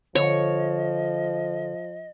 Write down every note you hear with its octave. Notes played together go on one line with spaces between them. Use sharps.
D3 F3 C#5 D#5